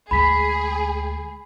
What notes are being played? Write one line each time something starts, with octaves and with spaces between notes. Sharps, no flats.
D2 G#3 G#4 B5 B6